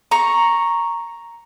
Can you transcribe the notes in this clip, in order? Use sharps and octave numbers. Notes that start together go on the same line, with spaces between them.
A#5 C#6